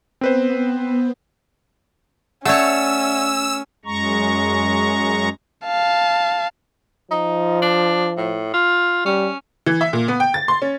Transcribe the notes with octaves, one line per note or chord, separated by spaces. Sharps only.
B3 C4 B4 C5
A3 C#4 C#5 D5 E5 F#5 E6
F#2 G#3 A#5 C#6
F5 A5
F3 D#4
D4
A2
F4
G3 C#4
E3
E5
A#2
B3
G5
A6
C6
C#4